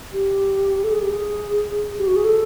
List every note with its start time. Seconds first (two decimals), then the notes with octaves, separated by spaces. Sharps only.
0.13 G4
0.84 A4
0.92 G#4
1.02 G4
1.10 G#4
1.98 G4
2.07 F#4
2.16 G#4
2.24 A4